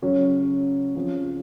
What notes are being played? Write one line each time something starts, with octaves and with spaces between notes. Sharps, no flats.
C#3 F#3 C#4 F#4
C#3 F3 C4